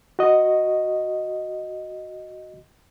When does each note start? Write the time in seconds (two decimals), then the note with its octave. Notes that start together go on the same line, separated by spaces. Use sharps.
0.19 F#4 D#5